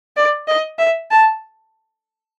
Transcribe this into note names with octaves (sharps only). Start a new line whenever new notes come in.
D5
D#5
E5
A5